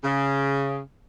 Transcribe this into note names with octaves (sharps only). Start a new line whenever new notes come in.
C#3